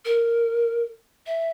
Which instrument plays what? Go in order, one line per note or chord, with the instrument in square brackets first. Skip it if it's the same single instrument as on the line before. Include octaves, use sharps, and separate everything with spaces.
[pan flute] A#4
E5